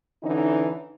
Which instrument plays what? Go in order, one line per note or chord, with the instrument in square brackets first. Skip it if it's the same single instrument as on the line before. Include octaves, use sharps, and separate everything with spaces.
[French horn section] D3 E3 C#4 D#4